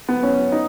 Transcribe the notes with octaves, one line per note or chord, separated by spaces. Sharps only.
B3
C#4
D#4